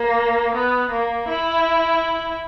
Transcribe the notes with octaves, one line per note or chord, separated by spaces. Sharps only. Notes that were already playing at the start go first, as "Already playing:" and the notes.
Already playing: A#3
B3
A#3
E4